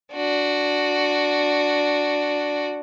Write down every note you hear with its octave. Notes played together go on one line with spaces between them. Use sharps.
D4 F#4